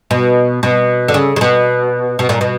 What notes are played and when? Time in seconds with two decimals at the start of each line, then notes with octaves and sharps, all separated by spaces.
0.11 B2
0.63 B2
1.08 D3
1.14 C#3
1.36 C#3
1.41 B2
2.19 B2
2.29 A#2
2.41 B2